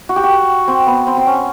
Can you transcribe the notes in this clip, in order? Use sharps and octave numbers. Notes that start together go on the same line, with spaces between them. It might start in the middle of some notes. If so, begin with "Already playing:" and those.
F#4
G4
F#4
C4
B3
C4
C4
C#4